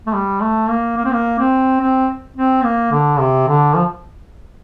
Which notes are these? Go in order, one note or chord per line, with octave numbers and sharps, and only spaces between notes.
A3
G3
A3
A#3
A#3
C4
A#3
C4
C4
C4
A#3
D3
C3
D3
F3